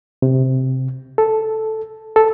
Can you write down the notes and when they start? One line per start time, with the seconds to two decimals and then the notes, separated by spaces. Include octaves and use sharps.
0.22 C3
1.18 A4
2.16 A4